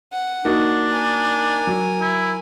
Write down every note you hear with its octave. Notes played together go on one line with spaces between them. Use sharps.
F#5
A#3 D4 D#4 F#4
A#4 G#5
F#3
E4